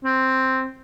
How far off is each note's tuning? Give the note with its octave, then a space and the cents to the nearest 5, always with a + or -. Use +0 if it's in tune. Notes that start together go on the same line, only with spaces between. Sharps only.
C4 +0